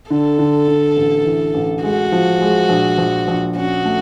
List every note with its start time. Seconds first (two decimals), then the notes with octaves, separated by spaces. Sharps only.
0.10 D3 A4
0.39 D3
0.68 D3
0.96 A1
1.25 E3
1.54 A1
1.83 G#3 F#4
2.12 F3
2.41 G#3
2.69 A#1
2.98 A#1
3.28 A#1
3.56 C#4 F#4
3.85 A3